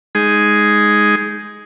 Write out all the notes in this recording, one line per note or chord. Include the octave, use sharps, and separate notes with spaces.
G#3 D#4 G#4